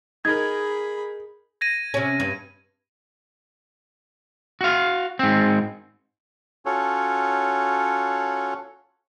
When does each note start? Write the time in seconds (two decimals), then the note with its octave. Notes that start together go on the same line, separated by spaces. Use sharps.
0.25 D#4 G#4 A#4 B5 G#6
1.61 G#6 A#6 D#7
1.94 C3 C#4
2.20 G2
4.61 F#4 F5
5.19 G#2 C4
6.66 C#4 F4 F#4 A4 C#5